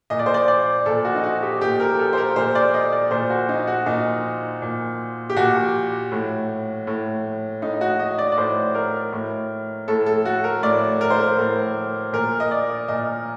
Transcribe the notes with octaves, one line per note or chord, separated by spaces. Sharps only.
A#2 D#5
D5
C5
D5
D5
A#2 A4
F#4
D#4
F#4
G4
A#2 G4
A#4
A4
C5
A#4
A#2 C5
D5
D#5
D5
A#2 C5
F#4
D#4
F#4
A#2 D#4
A#2
G4
A#2 F#4
A2
A2
A2 D#4
D#4
F#4
D#5
D5
D5
A2 C5
A#4
A2
A2 A4
A4
F#4
A#4
A2 D5
A#4
C5
A#4
A2
A#2 A#4
D#5
D5
A#2 D#5